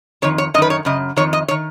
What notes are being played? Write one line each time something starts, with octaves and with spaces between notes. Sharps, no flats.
F2 D#3 C#5
C#5
F#2 D#3 B4 D#5
C#5
F#2 C#3 D#5
F2 D#3 C#5
D#5
D#3 C#5